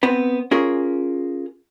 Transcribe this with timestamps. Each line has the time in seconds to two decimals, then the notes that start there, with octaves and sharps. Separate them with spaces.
0.03 B3 C4 B4
0.51 C#4 F4 G#4 A#4